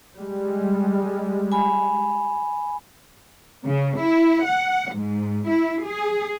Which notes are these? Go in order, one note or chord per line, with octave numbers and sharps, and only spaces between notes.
G3 G#3
G#5 B5
C#3
E4
F#5
G#2
E4
G#4